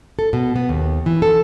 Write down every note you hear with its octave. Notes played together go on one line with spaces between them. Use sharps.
A4
B2
B3
D#2
E3
A4